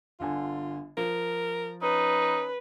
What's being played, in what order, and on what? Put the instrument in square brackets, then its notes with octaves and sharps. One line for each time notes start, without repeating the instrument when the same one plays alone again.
[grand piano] G1 D3 G#5 [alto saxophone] F4
[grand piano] F3 [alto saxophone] A#4
[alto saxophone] C#4 [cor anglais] D#4 [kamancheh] B4